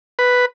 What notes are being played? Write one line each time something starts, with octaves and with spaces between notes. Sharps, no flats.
B4